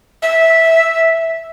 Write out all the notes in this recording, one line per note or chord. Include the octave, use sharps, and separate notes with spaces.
E5